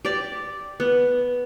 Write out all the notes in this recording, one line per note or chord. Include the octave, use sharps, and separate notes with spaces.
G4 D5
B3